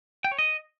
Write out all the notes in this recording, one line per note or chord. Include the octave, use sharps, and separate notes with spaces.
G5
C#5
D#5